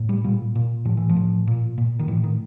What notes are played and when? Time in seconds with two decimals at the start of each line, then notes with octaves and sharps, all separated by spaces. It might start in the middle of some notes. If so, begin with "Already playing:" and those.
Already playing: A2
0.09 G3
0.24 A#2 G3
0.55 A#2
0.85 A2 F3
0.97 E3
1.09 F3
1.16 A2
1.47 A#2
1.78 A#2
1.99 D#3
2.08 A2 E3
2.24 D#3